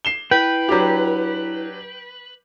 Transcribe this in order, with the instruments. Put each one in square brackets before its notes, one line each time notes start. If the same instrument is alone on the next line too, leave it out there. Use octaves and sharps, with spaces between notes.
[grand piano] C7 E7 G7
[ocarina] E4 [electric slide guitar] B4 [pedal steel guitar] G5
[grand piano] F#3 D4 G4